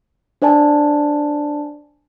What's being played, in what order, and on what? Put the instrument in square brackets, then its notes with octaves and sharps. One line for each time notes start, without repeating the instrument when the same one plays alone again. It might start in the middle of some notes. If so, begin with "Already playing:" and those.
[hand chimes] D4 C5 D5 G#5 A5